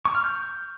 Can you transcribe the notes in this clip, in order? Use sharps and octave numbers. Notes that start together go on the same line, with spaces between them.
C#6
F6
G6